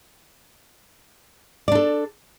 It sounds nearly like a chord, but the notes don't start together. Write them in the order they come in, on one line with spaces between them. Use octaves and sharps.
D5 D4 A4